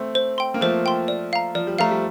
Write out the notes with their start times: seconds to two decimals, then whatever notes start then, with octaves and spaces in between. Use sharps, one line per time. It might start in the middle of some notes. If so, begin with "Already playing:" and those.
Already playing: A3 C4
0.15 C5
0.38 G5 C6
0.54 A#3
0.61 F3 A3 C5
0.86 G5 C6
1.08 D5
1.33 F5 A#5
1.55 F3 D5
1.67 G3
1.79 F3 A3 F5 A#5
1.91 G3